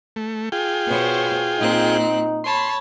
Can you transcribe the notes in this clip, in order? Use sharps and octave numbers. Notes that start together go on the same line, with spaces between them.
A3
F4 G#4 G5
B2 C5 C#5
A#2 C4 D#4 F#6
C#5 A5 B5 C6